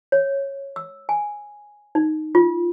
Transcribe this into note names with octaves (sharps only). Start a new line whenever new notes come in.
C#5
E6
G#5
D#4
F4